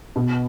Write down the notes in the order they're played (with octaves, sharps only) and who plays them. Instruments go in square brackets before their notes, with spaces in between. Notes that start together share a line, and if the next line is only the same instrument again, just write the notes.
[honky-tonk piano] B2